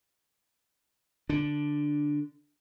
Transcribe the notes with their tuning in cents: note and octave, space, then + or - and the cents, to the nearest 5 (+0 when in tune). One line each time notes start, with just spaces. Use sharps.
D3 +0 D4 +5